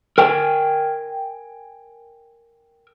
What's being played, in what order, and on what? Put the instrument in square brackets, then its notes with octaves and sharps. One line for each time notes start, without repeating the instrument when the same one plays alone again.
[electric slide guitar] A#4 G5 G#5